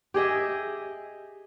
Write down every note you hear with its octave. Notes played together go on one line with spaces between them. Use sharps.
G4 G#4 D#5 E5